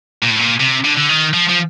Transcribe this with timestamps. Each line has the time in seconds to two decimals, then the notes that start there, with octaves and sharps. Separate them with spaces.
0.23 A#2
0.31 A2
0.39 A#2
0.60 C3
0.84 D3
0.97 D3
1.09 D#3
1.34 F3
1.49 F3